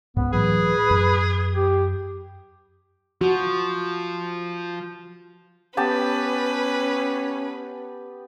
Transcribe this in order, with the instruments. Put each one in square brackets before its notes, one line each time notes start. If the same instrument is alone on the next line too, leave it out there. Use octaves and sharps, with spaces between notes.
[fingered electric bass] C#2 G#2 [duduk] B3
[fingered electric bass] A2 E3 F#3 [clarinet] G#4 [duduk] B4
[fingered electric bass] F#2
[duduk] G4
[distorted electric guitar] F3 [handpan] F#4
[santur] B3 G4 A5 [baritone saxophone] C#4 [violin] B4